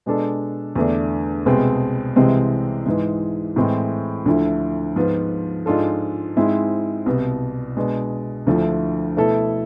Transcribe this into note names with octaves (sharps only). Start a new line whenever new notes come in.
B2 G#3 D4 A4
E2 D3 A3 D4
C2 B2 G#3 C4 G#4
C2 C3 E3 G#3 C4
G#2 E3 G#3
A2 E3 G#3 C4
D2 D3 F3 A3 E4
G#2 F3 B3 F4
G#2 G#3 D4 F4 A4
G#2 G#3 C4 E4
C2 B2 B3
B2 G#3 D4
D2 D3 F3 A3 E4
B2 A3 E4 A4